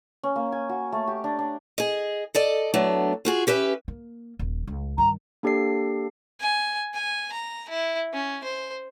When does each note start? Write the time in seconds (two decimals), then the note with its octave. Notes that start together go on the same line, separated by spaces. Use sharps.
0.23 C#4
0.36 A#3
0.52 G#5
0.69 F#4
0.92 A3
1.07 G4
1.24 D4
1.39 D4
1.78 G#4 D#5
2.35 A4 D5 D#5
2.74 F#3 A3 B3 D4
3.25 F4 F#4 G#4
3.47 C#4 G4 B4 E5
3.88 A#3
4.39 D#1
4.67 C#2
4.98 G2 D#3 A#5
5.43 A#3 D4 G4 A4 D5 C7
6.41 G#5
6.94 G#5
7.32 A#5
7.69 E4
8.14 C#4
8.44 C5